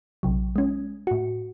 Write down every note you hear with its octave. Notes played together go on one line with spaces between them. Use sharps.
A#1 C3 F#3
G#3 C#4
A2 F#4